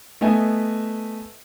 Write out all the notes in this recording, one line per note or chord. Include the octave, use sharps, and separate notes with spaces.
A3 B3 D#5 E5 G#5